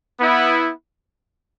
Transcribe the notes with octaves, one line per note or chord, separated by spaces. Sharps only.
B3 E4